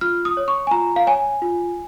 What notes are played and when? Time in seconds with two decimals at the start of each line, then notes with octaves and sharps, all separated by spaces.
0.01 F4 F6
0.25 D#6
0.37 C#5
0.48 C#6
0.67 G#5
0.71 F4 A#5
0.96 F5
1.07 C#5 G#5
1.42 F4